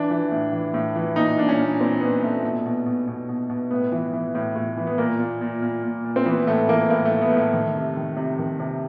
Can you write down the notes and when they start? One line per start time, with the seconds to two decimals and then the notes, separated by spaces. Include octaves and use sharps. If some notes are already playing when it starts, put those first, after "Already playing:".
Already playing: E3 D4
0.10 E3
0.31 A2
0.52 E3
0.74 A2
0.95 E3
1.16 A#2 D#4
1.37 A#2 D4
1.49 C#4
1.58 A#2
1.80 A#2 C4
2.01 A#2 B3
2.22 A#2 A3
2.44 B2
2.66 B2
2.86 B2
3.08 B2
3.29 B2
3.50 B2
3.71 A2 B3
3.92 E3
4.13 E3
4.35 A2
4.55 A2
4.77 E3
4.87 B3
4.98 A#2 A#3
5.19 A#2
5.41 A#2
5.62 A#2
5.83 A#2
6.05 A#2
6.16 C4
6.26 E3 B3
6.47 A2 A3
6.68 E3 A#3
6.89 A2 A#3
7.05 A3
7.11 E3
7.21 B3
7.32 A2 A3
7.53 D#3
7.75 C3
7.96 D#3
8.17 C3
8.39 D#3
8.60 C3